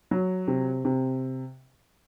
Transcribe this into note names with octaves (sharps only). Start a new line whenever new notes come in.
F#3
C3
C3